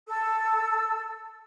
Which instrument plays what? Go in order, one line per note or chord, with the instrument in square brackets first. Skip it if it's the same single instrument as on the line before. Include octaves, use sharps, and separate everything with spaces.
[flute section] A4 E6